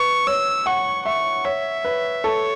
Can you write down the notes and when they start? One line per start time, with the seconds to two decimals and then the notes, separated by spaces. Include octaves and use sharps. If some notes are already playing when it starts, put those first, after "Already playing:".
Already playing: B4 C#6
0.27 C#5 E6
0.66 F#5 C#6
1.05 E5 C#6
1.45 C#5 E5
1.85 B4
2.24 A4 C#5